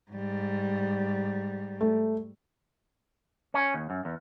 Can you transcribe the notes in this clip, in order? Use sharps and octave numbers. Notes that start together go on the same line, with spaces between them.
G#2 G3
A3
C#4
D#2
F#2
E2